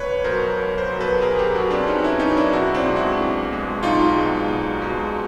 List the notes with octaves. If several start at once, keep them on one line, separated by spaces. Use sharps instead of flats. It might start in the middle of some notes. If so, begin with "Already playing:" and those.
Already playing: B1 B4 C#5
B2 F#3 A#4 C5
B1
A#4 C5
B2 F#3
A4 B4
B1 G#4 A#4
G4 A4
B2 F#3 F#4 G#4
C4 D4
B1 C#4 D#4
D4 E4
B2 F#3 C#4 D#4
D4 E4
B1 E4 F#4
C4 D4
B2 G#3
E4 F#4
B1
B2 G#3
B1 D#4 F4
B2 G#3
B1
B2 G#3